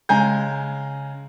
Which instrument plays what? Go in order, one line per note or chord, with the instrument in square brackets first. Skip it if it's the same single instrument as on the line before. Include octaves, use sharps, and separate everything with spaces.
[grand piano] C#3 G#3 G#5 A#5 G6